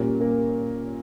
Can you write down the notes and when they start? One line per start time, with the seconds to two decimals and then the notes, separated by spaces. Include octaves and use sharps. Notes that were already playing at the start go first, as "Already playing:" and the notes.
Already playing: A#2 G3 A#3 C#4 C#5
0.21 A#3 A#4